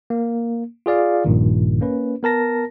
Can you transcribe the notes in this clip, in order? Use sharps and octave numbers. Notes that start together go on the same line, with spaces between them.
A#3
F4 G#4 D5 F5
A#1 G2 A#2 D#3
A#3 C#4 B4
B3 A#4 A5 A#6